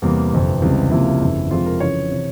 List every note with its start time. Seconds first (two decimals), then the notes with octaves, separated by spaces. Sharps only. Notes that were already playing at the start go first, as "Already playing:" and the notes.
0.02 E2 C3 G3 A#3
0.32 G1 F2 C3
0.62 C#2 C3 E3 G3
0.91 C#2 C3 F3 A#3 E4
1.21 G1 F2 C#3
1.51 F2 C3 F3 G#3 F4
1.66 A#4
1.80 F2 C#3 E3 C#5
2.11 C3 E3